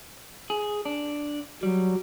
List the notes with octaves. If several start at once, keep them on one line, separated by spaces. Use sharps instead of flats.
G#4
D4
F#3 G3